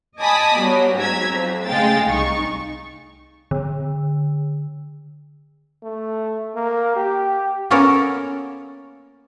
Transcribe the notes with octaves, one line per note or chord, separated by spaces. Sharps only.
D#5 G#5 A5 B5 D6 D#6
F#3 G3 B3
G#2 F#3 A#5 E6 G#6 B6
F2
C#3 G#3 A3 F5 G5 A6
C2 D#4 C#6
D3
A3
A#3
G4
A#3 B3 C#4 F#4 A4 A#4